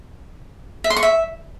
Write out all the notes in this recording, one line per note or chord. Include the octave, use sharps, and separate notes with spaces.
E5
C6
C#6
E5